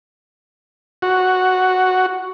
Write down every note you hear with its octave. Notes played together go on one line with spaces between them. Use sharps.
F#4